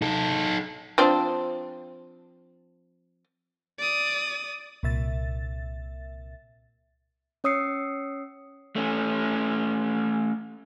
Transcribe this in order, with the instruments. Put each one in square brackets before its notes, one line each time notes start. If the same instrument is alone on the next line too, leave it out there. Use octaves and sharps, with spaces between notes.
[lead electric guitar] D#4 A4
[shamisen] F3 C4 D4
[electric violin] D5 D#6
[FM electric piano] C2 A#2 E5 A6
[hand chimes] C#4 C#5 D#6 E6 C7 C#7
[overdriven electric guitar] A3 C#4